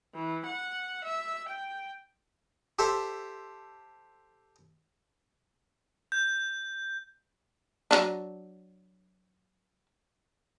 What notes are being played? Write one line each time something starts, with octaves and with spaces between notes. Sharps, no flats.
E3
F#5
E5
G5
G4 A4 C5 E5
G6
F#3 C#4 D4